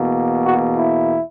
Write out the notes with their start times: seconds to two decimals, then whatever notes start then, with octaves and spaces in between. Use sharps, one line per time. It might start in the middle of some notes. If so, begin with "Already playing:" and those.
Already playing: E2 B2 A#3
0.46 F#4
0.76 E4